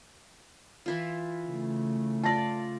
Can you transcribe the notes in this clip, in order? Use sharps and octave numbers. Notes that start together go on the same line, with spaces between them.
E3 E4 F4
C#3 A3
F4 D5 A5 A#6